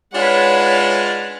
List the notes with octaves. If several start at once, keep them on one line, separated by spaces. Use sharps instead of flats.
G#3 D4 D#4 F4 B4 C#5 F#5